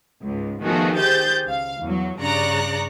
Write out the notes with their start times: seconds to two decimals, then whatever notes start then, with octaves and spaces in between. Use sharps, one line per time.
0.22 C#2 G#2
0.62 D#3 F3 A3 B3 F#4 G#4
0.97 G4 G#4 C5 G6 A6
1.47 C#2 F5
1.81 E2 F#3
2.19 G2 C#3 D5 A#5 C#6 F#6